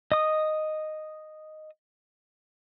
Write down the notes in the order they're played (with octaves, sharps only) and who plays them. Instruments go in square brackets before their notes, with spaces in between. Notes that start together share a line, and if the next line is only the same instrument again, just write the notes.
[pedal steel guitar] D#5 D#6